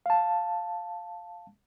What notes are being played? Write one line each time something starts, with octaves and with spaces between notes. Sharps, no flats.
F5 A5